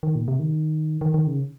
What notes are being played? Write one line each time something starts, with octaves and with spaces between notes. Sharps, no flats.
D#3
A#2
C3
D#3
D#3
D#3
C#3